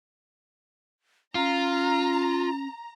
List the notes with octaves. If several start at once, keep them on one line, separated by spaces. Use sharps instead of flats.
C#4 F4 A#5